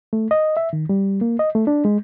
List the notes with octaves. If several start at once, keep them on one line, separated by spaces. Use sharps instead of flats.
A3
D#5
E5
D#3
G3
A#3
D#5
A3
D4
G#3